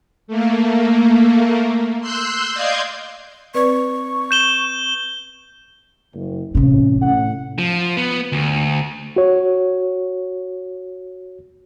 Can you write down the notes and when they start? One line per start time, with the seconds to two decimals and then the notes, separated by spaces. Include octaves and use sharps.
0.27 A3 A#3
2.01 C6 E6 F#6 G6
2.53 D5 D#5 F5 C6 G6 G#6
3.55 C4 B4 D5 C#6
4.31 G6 E7 G7
6.14 F#1
6.55 A1 C3 C#4
7.01 A2 F#5
7.59 F3
7.97 B3
8.32 D2
9.16 F#4 C#5